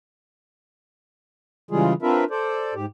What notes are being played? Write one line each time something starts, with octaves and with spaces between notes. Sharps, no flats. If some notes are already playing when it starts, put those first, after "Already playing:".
C#3 E3 G3 G#3 F4 G#4
C4 D4 F4 A#4 B4 E5
A4 C5 D5
G#2 G4